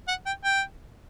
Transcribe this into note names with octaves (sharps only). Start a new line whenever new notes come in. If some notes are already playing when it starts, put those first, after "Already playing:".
F#5
G5
G5